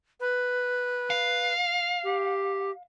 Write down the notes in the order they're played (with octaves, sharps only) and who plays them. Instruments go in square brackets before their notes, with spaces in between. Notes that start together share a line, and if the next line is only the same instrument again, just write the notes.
[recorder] B4
[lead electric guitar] F5
[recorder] G4